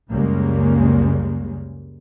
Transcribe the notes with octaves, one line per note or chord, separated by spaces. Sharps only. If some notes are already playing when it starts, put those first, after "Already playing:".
C#2 F#2 G3 G#3 A#3 C#4